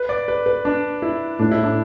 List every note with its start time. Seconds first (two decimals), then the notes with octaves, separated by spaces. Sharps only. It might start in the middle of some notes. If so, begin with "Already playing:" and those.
Already playing: B4
0.09 D5
0.28 B4
0.46 B4
0.65 D4
1.02 E4
1.39 A2 D4
1.52 E4
1.63 D4